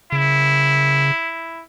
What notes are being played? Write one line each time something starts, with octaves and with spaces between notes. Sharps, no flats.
C#3 E4